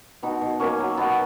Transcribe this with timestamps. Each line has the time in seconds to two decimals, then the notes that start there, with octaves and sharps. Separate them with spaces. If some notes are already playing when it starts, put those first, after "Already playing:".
0.23 B2 B3 D#4
0.41 B2
0.59 F#3 A#3 C#4
0.79 F#3
0.97 B2 B3